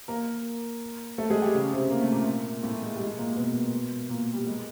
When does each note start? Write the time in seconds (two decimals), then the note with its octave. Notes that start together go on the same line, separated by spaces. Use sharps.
0.08 A#3 A#4
1.18 A3 A4
1.30 G#3 G#4
1.42 G3 G4
1.54 C#3 C#4
1.72 C3 C4
1.90 A#3
2.01 A3
2.12 A#2 A#3
2.63 A2 A3
2.83 G#3
2.95 G3
3.01 G#3
3.18 A#2 A#3
3.36 B2 B3
4.09 A#2 A#3
4.34 G3
4.47 G#3